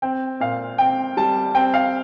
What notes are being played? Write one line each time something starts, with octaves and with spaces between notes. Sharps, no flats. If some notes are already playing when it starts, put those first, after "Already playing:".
C4 G5
A#2 F5
C4 G5
G3 A5
C4 G5
F5